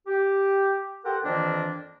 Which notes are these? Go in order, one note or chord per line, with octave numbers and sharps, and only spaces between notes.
G4
G4 A4 A#4 C5 F#5
F2 D#3 E3 A#3 C4 D4